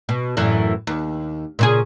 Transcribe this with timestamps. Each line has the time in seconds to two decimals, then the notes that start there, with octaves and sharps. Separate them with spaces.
0.09 B2
0.37 F#2 A2 E3
0.87 D#2
1.59 A#2 C#3 G#4